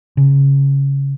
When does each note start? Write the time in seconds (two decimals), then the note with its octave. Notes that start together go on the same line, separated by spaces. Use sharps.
0.17 C#3